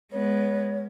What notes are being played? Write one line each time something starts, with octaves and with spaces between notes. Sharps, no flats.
G#3 B3 C#5